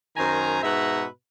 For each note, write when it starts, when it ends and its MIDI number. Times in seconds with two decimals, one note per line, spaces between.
0.17 0.61 42
0.17 0.61 51
0.17 0.61 72
0.17 0.61 80
0.17 0.61 82
0.63 1.05 44
0.63 1.05 47
0.63 1.05 71
0.63 1.05 76
0.63 1.05 78
0.63 1.05 82